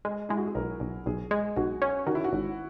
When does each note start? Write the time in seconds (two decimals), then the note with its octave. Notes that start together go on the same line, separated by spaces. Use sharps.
0.05 G#3 G#4
0.29 G#3 E4
0.37 F#4
0.46 G#4
0.55 B1 A#4
0.80 B1
1.06 B1 G#4
1.31 G#3
1.56 B1 F#4
1.82 C#4
2.07 D#3 F#4
2.15 E4
2.24 F#4
2.32 G#1